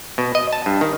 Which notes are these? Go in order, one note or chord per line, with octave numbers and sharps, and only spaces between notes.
B2
D#5
A5
G2
D#3